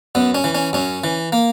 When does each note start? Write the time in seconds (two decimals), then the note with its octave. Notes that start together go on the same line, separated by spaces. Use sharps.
0.15 F#2 B3
0.35 C#4
0.44 E3
0.55 C#4
0.73 F#2 C#4
1.04 E3
1.32 A#3